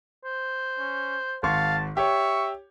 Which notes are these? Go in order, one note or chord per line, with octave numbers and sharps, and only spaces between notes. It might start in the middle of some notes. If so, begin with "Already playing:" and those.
C5
C#4
G#1 F5 A5 C6 C#6
G4 C#5 E5 C#6